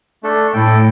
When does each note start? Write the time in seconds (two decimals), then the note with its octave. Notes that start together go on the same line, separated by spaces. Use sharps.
0.23 A3 D4 A4
0.54 A2 E4 A4 G5